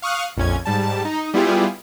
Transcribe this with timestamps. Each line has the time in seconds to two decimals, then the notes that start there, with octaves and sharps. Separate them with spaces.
0.02 F5 C#6 D#6 F6 F#6
0.37 A#1 F2 C#4 G#6
0.65 G#2 G3 A5
1.05 D#4
1.34 G3 B3 E4 F4 G4 G#4